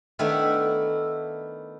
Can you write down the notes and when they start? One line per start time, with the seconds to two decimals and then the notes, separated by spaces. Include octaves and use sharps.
0.19 D#3 A3 B3 D4 E4